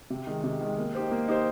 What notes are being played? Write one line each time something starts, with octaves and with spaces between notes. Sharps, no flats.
C3
D#3 G#3
C3
D#3 G#3
A#3
D#4 G4 C5
A#3
D#4 G4 C5